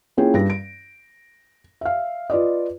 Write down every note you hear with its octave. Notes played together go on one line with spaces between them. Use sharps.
A#3 C#4 E4 F4 G#4 G5
G2 A#6
D7
E5 F5
F4 B4 D5 D#5